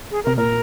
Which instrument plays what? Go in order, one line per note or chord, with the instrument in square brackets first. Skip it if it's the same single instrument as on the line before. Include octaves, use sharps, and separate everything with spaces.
[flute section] G#4
[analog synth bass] C3 [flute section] A#4
[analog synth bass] A#2 [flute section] A#4